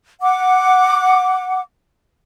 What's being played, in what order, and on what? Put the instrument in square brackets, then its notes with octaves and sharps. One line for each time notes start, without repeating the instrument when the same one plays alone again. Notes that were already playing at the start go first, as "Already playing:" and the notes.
[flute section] F#5 D6